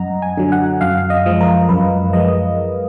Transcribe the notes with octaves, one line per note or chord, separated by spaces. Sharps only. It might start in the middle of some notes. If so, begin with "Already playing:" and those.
Already playing: F#2 D#5 F#5 A#5
G#5
D3 F#3
F#5
F#2 F5
D#5
F3 G#3
A#4
F#2 B4
F3 G#3 D#5